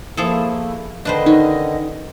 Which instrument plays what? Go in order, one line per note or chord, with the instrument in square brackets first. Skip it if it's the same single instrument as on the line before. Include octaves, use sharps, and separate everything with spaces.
[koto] F3 G#4 A4 [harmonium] A3 A#3 E4
[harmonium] D3 D#3 D#5 [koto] D4 B4 C5
[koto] C#4 [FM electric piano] D#4